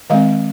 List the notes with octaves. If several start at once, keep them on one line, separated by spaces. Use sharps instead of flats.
D#3 G#3 C4 D#5 F5